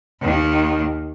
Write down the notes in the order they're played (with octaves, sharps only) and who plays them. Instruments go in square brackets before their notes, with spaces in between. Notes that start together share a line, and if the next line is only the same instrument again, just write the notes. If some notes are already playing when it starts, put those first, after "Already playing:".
[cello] D#2 D#3